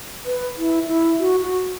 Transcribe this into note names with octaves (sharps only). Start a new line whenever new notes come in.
B4
E4
E4
F#4
F#4